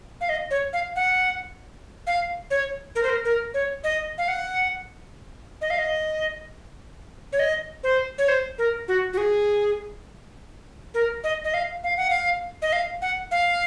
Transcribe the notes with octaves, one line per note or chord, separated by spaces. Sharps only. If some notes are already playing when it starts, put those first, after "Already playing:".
F5
D#5
C#5
F5
F#5
F5
C#5
A#4
C5
A#4
A#4
C#5
D#5
F5
F#5
D#5
F5
D#5
C#5
D#5
C5
C#5
C5
A#4
F#4
F#4
G#4
A#4
D#5
D#5
F5
F5
F#5
F5
D#5
F5
F#5
F5